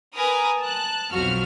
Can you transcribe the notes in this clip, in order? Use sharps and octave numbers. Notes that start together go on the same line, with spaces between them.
A#4 B4 G#5 A#5 D#6
A5 F#6
B1 F2 F#3 F#4 F6